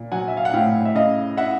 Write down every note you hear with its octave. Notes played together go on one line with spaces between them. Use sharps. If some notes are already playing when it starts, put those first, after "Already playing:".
Already playing: A#2
F#3 F#5 G#5
E5
F5
F#5
A2 F5 G5
E5
C#3 D#5 F5
E5 F#5